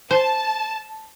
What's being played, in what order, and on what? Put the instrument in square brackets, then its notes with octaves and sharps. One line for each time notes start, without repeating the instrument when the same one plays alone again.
[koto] C5 [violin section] A5